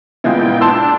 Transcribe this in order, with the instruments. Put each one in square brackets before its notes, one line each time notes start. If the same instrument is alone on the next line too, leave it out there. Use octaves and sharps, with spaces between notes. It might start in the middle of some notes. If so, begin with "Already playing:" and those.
[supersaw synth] A#2 G5 [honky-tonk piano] C#3 F3 G#3 [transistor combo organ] B3 E4
[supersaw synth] D4 [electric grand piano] A5 C6 E6